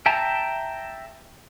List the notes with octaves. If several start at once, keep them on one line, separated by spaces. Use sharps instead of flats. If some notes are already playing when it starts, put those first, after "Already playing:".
E5 G5 A5 A#5